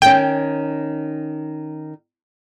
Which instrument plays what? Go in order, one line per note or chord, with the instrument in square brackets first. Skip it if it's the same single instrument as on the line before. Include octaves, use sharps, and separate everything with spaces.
[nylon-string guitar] D#3 C#4 [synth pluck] G5